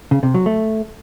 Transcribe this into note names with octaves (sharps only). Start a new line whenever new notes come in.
C#3
C3
F#3
A3